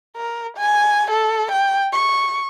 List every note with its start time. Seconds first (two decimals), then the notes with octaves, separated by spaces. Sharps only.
0.16 A#4
0.57 G#5
1.10 A4
1.51 G5
1.92 C#6